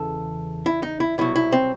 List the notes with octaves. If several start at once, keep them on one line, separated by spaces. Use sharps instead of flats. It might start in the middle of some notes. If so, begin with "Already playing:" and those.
Already playing: E2 C#3 E3 A4
E4
D#4
E4
C2 B2 F#3 E4
E4
C4